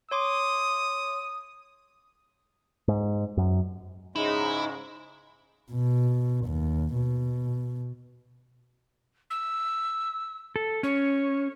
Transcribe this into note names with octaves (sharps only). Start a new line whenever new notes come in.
C#5 C6 D6 D#6
G#2
F#2
G#2 C#3 G#3 D#4 E4
B2
D#2
B2
E6
A4
C#4 C#5